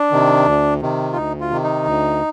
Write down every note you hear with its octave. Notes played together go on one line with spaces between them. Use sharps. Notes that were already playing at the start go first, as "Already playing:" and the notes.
Already playing: D4
C3 D#3
D2
C3 D#3
F4
D2 D#4
F4
C3 D#3
D#4
D2